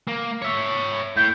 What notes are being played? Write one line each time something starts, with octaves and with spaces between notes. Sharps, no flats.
A#3
C#5 E5
A2 G6